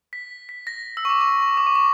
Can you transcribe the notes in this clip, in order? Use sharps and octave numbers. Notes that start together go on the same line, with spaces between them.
B6
B6
A#6
E6
C#6
D6
C#6
C#6
D6
C#6
D6